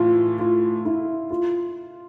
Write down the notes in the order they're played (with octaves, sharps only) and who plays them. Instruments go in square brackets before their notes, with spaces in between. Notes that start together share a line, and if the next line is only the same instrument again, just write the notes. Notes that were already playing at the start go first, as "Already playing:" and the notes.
Already playing: [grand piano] A2 E3 [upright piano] F4
[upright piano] F4
E4
F4